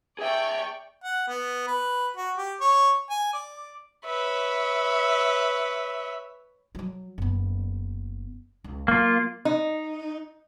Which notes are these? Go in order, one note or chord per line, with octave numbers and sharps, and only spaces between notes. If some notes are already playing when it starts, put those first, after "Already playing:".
G#4 D5 E5 G5 C#6
F#5
B3
B4
F#4
G4
C#5
G#5
D5
B4 C#5 E5
F3 F#3
F#1 B3
C#2
F#3 A#3 F4
D#4